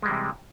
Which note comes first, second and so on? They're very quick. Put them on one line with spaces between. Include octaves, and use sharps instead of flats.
G#3 G3 E3 C3